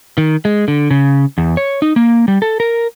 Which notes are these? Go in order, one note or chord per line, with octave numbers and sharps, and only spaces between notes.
D#3
G#3
D3
C#3
E2
C#5
D#4
A#3
G3
A4
A#4